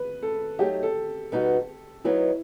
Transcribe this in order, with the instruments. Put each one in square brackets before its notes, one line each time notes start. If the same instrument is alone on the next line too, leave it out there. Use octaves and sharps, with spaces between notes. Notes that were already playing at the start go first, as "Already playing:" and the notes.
Already playing: [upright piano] B4
A4
[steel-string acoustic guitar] F#3 A3 D#4 [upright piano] G4
[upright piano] A4
[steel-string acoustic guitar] B2 G3 B3 D#4 F#4
[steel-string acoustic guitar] F#3 B3 D#4 [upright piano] E4